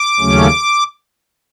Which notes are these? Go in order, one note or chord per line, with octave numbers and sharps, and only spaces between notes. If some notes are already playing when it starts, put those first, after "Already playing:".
Already playing: D6
D#2 C#3 F#3 A3 C#4